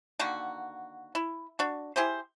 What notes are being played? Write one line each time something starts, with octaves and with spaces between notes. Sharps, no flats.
D3 D#3 A#3 F#4
E4
D4 F#4
E4 G4 G#4 C5